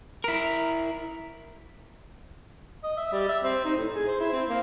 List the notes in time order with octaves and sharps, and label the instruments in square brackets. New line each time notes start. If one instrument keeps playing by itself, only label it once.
[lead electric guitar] E4 A#4
[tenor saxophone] D#5
E5
G3
E5
C4
D#4
A2
G#4
C5
E4
C4
A#3